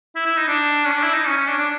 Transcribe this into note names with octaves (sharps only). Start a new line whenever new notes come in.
E4
E4
D#4
D4
C#4
D4
E4
D#4
C#4
C#4
D4
D4